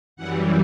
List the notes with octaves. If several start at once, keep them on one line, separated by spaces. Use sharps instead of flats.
F#2 E3 G3 F#5